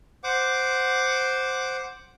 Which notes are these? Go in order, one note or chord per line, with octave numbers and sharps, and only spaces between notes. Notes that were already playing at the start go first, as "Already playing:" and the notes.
C5 F#5 D6